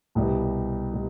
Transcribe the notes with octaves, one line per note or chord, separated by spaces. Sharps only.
C2 B2 G3
B2 G3